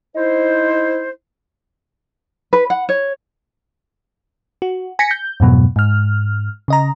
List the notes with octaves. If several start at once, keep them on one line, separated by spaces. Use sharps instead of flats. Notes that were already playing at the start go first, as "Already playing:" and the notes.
D#4 E4 C5
B4
F#5
C#5
F#4
G#5 A#6 B6 C#7
G6
F2 G#2 B2 F#3
G#2 F6
C#3 D#5 A#5